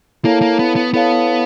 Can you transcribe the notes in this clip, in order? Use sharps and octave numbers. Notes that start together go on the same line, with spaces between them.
A#3 E4 A4 C#5 F5 A5
A#3
B3
B3
B3 E4 A4 C#5 F5 A5